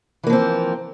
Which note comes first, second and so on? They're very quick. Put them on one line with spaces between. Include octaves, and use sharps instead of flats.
E3 A#3 F3 C4